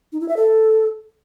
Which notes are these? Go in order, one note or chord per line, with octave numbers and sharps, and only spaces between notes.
D#4
E4
E5
A4